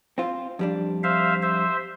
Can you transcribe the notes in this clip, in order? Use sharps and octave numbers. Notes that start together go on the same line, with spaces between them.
C4 F4
F2 G3 D4
C5 E5 F5
C5 E5